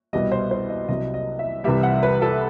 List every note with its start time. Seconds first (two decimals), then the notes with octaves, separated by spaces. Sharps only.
0.13 C2 B2 G3 D#5
0.32 C5
0.51 C5
0.70 D#5
0.89 C2 C3 F#3 D#5
1.14 D#5
1.39 E5
1.64 C2 C3 E3 G3 E5
1.83 F#5
2.03 B4
2.22 A4